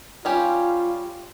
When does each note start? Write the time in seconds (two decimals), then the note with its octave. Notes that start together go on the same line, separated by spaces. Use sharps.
0.25 G3 C#4 F4 G4